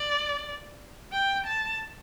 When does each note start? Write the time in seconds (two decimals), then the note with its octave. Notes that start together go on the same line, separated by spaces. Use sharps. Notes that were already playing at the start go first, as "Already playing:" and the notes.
Already playing: D5
1.13 G5
1.46 A5